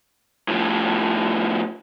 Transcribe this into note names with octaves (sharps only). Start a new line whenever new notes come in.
A2 F3